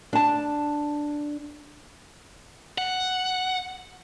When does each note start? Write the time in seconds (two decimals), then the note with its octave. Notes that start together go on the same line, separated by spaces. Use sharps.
0.13 D4 A5
2.78 F#5